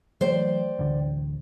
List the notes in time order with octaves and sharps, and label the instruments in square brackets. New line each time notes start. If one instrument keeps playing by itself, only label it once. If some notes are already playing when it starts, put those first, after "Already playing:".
[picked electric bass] E3 F#3 A3 [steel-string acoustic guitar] C5 D5 G5
[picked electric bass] A1 D2 D3